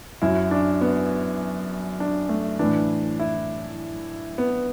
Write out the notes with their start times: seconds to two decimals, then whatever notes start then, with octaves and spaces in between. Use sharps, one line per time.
0.22 F#2 F#3 E4
0.51 D4
0.81 B3
2.00 D4
2.29 A3
2.59 A2 E3 D4
3.20 E4
4.38 B3